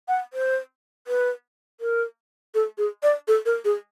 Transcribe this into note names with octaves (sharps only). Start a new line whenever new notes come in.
F#5
C5
B4
A#4
A4
G#4
D5
A4
A#4
G#4